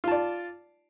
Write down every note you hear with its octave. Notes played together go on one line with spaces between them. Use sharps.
F4 D5 A5